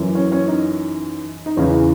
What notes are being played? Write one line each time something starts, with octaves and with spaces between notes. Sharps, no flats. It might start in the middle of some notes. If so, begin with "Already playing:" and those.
Already playing: F#2 E3
C#4
C#4
D#4
D#4
E2 C#3 E3 C#4